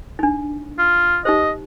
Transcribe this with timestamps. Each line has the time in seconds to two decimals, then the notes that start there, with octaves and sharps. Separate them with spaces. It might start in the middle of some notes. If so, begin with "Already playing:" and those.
0.19 D4 D#4
0.79 F4
1.25 D#4 G4 C5 D#5